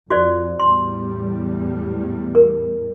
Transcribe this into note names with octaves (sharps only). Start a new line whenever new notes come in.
F2 F#4 C5 D5
E2 A2 G3 C6
A#4